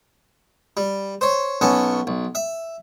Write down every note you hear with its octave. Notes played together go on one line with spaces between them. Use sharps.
G3
C5 C#5
B1 B3 C#4 A4
B1
E5